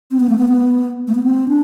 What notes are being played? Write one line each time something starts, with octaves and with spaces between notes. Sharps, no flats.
C4
B3
A3
B3
B3
A3
B3
C4
D4